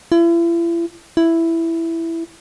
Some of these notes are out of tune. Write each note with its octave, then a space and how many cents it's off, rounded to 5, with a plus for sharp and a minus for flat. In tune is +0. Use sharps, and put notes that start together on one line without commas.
E4 +40
E4 +5